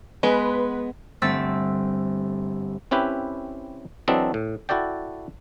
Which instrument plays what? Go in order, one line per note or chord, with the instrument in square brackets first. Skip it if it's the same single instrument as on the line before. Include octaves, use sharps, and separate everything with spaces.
[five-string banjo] G#3 [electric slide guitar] B3 [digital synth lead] B4
[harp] G1 A3 C4 E6 A6 B6
[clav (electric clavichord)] C4 C#4 E4 G4 B4
E3 F#3 C4 D4 A4 D#5
A2
E4 F#4 A4 D5 G5